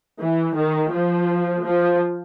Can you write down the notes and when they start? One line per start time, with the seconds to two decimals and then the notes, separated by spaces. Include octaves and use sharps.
0.21 E3
0.56 D#3
0.93 F3
1.65 F3